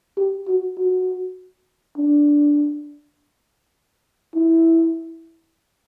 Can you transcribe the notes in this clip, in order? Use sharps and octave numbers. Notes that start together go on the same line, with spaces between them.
G4
F#4
F#4
D4
E4